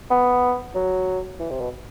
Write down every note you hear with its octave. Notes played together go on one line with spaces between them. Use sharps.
B3
F#3
E3
C3
B2